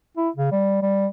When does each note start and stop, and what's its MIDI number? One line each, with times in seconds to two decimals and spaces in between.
0.17 0.29 64
0.36 0.51 49
0.52 0.78 55
0.82 1.07 55